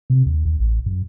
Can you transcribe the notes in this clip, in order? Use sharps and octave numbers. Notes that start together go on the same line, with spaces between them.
C3
D#2
D#2
A1
F#2